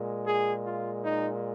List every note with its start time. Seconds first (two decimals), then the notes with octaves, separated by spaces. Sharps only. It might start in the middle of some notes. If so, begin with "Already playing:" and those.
Already playing: A#2 G#3
0.26 G#4
0.65 F4
1.03 D#4